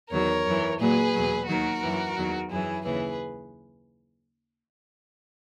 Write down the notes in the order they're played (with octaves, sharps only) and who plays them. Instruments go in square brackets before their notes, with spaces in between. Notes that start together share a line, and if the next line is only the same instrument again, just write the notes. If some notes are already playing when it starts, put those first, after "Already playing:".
[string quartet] E2 D#3 F#3 A#4 C#5
F#2 E3
A#2 F#3 G#4 B4
E2 B2 F#3
D#2 D#3 F#3 F#4 A#4
F#2 E3
E2 D#3 F#3
F#2 E3 E4 G#4
D#2 C#3 E3 G#4 B4